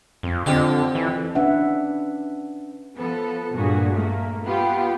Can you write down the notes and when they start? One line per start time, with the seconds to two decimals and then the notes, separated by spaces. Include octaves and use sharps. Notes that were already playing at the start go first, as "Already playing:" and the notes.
0.23 F2
0.46 F2 D3 G4 D6
0.95 E3
1.35 C#4 D4 B4 E5 F#5
2.96 F3 B3 A4
3.53 G2 A#2 F#4 G#4
3.93 A3 A#3
4.43 B3 F4 G4